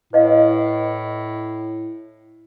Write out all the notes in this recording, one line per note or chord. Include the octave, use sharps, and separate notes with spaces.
A2 B4 D#5 F5